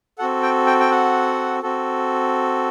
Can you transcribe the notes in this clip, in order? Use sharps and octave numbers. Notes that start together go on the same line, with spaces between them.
C4 F#4 A4 F#5
G5
G5
G5
F#5
C4 F#4 A4